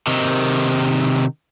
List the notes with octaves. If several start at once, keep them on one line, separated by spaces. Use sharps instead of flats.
C3 D#3